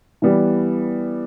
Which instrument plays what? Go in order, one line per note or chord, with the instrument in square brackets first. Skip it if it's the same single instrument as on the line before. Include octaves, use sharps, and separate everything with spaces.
[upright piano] E3 G3 B3